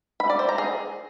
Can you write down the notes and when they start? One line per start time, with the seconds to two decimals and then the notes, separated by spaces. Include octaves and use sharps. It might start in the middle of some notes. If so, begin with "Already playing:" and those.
0.20 B5
0.30 D5
0.39 C5
0.49 A#5
0.58 G#4